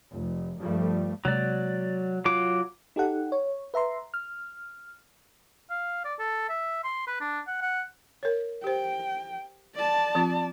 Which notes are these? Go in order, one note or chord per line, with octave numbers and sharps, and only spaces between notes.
F1
G2 F3 G3 A3
C3 F#3 G#3 A#3 D5
F#3 F4 D6
D#4 G4 A4 F#5
C#5
B4 E5 A#5 C6
F6
F5
D5
A4
E5
C6
B4
D4
F#5
F#5
A#4 C#5
G4 C5 G5
D5 A5
F3 C4 F4